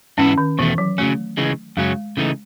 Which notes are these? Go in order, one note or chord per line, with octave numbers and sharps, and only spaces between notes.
G#2 E3 B3 C#4 E4
D#3
E2 B2 E3 A3
F#3
C#3 F#3 A3 C#4
C#3 E3 G#3
F#2 C#3 F#3 G#3 C#4
C#3 E3 A3 D#4